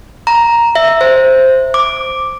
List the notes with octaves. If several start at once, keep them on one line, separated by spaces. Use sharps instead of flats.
A#5
E5
C5
D6